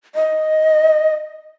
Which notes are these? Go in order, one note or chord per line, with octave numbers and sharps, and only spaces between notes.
D#5